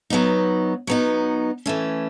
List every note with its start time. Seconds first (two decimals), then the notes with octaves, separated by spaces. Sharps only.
0.10 F#3 B3 D#4
0.87 F#3 B3 D#4
1.66 E3 A3 C#4